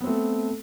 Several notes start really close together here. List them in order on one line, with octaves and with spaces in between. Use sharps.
B3 C4 A3